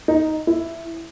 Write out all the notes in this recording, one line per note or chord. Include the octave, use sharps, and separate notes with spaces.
D#4
E4